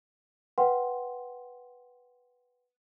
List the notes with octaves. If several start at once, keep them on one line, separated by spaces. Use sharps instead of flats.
B4 F#5 G5 C6